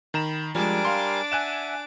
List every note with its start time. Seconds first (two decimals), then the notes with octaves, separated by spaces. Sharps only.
0.14 D#3 A#5 B5 E7
0.55 F3 G3 G#3 D4 A#4 G#5 D6
0.85 F5 C6
1.32 E5 F#5 G#5 F#6 E7